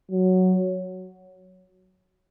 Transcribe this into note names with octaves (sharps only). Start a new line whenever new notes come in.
F#3